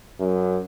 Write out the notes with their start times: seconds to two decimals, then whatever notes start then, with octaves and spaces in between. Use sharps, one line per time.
0.20 F#2